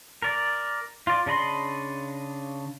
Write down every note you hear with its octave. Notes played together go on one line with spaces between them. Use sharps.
A#4 D5
F4 D5
C#3 D4 D#5 B5 C6